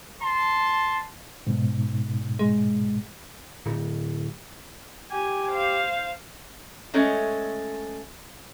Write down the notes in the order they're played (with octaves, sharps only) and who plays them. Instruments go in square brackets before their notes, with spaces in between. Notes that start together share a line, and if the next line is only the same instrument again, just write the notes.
[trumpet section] A5 C6
[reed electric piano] G#2 B2
[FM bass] G#3
[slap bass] D1
[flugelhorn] G4 [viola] G#5
[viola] C5 F5
[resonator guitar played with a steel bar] G#3 A3 C#4 C#5 D#5